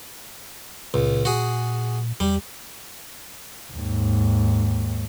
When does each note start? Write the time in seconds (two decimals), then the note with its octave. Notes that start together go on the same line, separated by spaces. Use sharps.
0.94 C#2 A#2
1.25 F#4 G#4
2.20 E2 G3
3.73 D#2 G#2